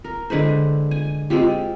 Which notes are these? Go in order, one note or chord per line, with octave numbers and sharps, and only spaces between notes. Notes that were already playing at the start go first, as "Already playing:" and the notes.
A#4
D3 G#3 B4 C5
G#5
G#3 C4 F4 G4